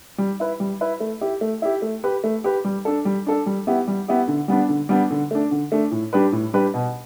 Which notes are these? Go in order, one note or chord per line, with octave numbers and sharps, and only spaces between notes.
G3
E4 B4
G3
E4 B4
A3
E4 G4
A3
E4 G4
A3
G4 B4
A3
G4 B4
G3
D4 A4
G3
D4 A4
G3
B3 E4 G4
G3
B3 E4 G4
D3
G3 B3 D4
D3
G3 B3 D4
D3
A3 D4
D3
A3 D4
A2
G3 D4 G4 B4
A2
G3 D4 G4 B4
B2